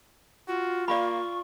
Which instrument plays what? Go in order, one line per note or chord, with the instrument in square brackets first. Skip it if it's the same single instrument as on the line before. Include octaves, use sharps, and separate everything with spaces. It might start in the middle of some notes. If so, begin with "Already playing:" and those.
[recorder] F4 [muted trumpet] F#4
[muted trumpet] A#3 [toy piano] D5 F5 B5 [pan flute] C#6